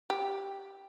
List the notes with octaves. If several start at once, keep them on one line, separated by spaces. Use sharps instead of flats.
G4